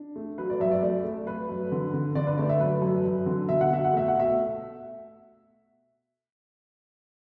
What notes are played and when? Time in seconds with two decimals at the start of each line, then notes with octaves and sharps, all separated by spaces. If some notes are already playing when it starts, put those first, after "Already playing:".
Already playing: D4
0.16 A3
0.38 F#3 B4
0.50 D5
0.60 F#2 E5
0.71 D5
0.82 A3 D5
1.04 A3
1.27 A3 B4
1.49 F#2
1.72 D3
1.94 D3
2.15 D3 D5
2.27 B4
2.38 A3 D5
2.49 E5
2.60 F#2 B4
2.82 F#2
3.05 F#2
3.26 D3
3.49 B2 E5
3.61 F#5
3.71 B2 E5
3.85 F#5
3.93 A3 E5
4.08 F#5
4.15 B2 E5